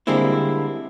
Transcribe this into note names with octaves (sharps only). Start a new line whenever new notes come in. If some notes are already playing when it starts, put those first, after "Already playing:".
D3 G3 G#3 A#3 C4 E4